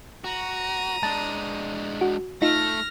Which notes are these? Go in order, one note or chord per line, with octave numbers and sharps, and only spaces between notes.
F#4 A#5 D#7
G#3 D4 A5
F#4
A3 D#4 F4 F6 A#6